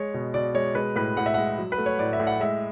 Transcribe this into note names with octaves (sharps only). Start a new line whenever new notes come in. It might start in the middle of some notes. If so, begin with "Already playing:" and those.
Already playing: G#3 C#5
B2
B2 D5
G#3 C#5
G#3 B4
A2 B4
A2 F#5
E5
G#3 F#5
F#3
B4
A3
C#5
A2 D5
E5
A2
F#5
G#3 E5